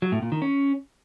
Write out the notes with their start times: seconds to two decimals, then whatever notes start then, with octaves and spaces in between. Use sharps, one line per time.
0.02 F#3
0.12 A2
0.22 A#2
0.32 D#3
0.42 C#4